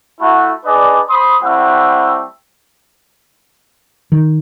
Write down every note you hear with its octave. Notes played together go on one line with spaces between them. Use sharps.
A3 E4 F#4
D4 G#4 B4 D5 D#5
C5 B5 C6 D#6
G3 A3 C4 E4 E5 F#5
D#3